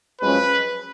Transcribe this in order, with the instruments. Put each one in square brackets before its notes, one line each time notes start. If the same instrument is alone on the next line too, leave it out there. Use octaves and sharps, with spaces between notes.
[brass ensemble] F#2 F3 G#3 C#4 B4